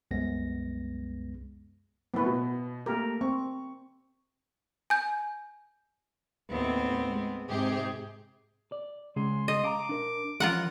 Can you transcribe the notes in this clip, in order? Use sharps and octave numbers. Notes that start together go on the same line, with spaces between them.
C2 F#2 G#3 B3 A#6
F#1 A2 B3 B4 C#6
B2
A3 A#3 G4 A#4
C4 C#6
G#5 G6
D#2 A2 B3 C4
G#3
G#2 C3 G4 G#4
D5
C#3 G#3 G#4 C6
D#5 C6
F5 A5 A#5 D6
D4 A#4
E3 F3 C#4 F4 A#4 F#5